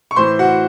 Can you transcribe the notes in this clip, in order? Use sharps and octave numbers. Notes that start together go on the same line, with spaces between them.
C#6
A2 E3 C5 C6
F#4 F#5